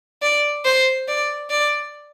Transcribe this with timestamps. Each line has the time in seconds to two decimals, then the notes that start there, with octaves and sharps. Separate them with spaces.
0.22 D5
0.65 C5
1.08 D5
1.50 D5